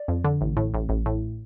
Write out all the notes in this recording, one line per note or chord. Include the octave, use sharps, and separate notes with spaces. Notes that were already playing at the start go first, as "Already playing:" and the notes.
Already playing: D5
F2
D3
A1
A2
A1
A1
A2